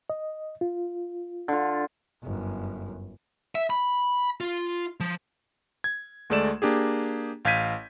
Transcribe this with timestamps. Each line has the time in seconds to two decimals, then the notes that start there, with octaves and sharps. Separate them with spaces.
0.10 D#5
0.61 F4
1.48 D3 F4
2.23 G1 F#2
3.55 E5
3.70 B5
4.41 F4
5.00 F3
5.84 G#6
6.30 D2 G#3 A3 D5 E7
6.62 A#3 D4 G4 G#4
7.45 A1 F5 G6 G#6 B6 D#7